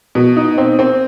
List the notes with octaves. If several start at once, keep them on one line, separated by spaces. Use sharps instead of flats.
B2
D#4
C4
C4